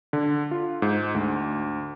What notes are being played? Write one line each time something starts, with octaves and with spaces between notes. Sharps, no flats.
D3
F4
G#2
D2